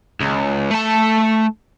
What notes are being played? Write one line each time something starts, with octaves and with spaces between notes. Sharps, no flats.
C#2
A3 A5